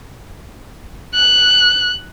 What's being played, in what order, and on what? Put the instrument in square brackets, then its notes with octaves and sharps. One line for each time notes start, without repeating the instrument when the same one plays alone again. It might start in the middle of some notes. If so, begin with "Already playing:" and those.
[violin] F#6